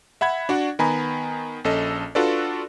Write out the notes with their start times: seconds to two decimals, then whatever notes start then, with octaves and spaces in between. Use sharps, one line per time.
0.21 E5 F#5 B5 G#6
0.49 D4 F#4 D5 F#5
0.79 D#3 B3 G#5 A#5 B5
1.64 A#1 C#4 A4 D#5
2.15 D4 F4 F#4 A4 B4 D5